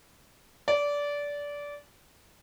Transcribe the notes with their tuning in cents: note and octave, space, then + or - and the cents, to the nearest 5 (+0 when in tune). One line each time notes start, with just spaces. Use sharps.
D5 -20